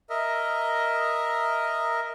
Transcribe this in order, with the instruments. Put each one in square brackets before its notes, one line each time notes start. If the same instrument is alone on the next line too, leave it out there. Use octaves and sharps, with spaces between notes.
[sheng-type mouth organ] A#4 D#5 E5